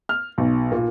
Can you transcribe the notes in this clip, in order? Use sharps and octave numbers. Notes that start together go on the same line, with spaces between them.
F6
B1
A#2